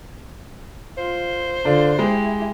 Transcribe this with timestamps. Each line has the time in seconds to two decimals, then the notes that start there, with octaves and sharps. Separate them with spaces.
0.97 F4 C5
1.65 D3 D4 F4
1.99 G#3 E4 G4